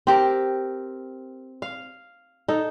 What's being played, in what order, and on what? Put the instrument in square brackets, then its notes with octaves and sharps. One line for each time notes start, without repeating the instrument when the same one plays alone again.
[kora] C4 G4 A#4
F5
D#4 A4